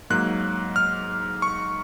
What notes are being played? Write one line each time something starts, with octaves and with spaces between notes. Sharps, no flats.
G#2 F#3 A#3 F#6
F6
C#6